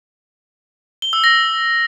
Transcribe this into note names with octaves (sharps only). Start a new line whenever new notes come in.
G7
E6
A#6